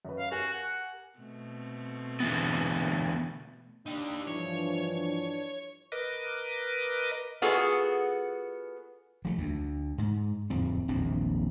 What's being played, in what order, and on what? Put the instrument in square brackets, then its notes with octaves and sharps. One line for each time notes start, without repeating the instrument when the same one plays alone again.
[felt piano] F#2 B4
[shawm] F5
[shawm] F#4 [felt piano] G4 A#4 G#5
[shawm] F#5
[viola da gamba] B2 A3 C4
[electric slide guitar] D3 E3 B3
[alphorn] D4 [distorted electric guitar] D#4 G4
[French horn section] G2 E3 F3 [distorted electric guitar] C#5
[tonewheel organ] A#4 B4 D#5 D6
[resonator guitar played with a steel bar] B3 F4 F#4 G#4 A4
[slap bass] F3 A3
D2
G#2
D1 F2 C4
D#1 A#1 E2 C4